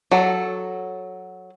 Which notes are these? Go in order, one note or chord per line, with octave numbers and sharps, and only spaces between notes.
F#3 A4